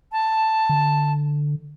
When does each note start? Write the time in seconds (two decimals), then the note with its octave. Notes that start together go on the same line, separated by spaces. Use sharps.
0.12 A5
0.69 D3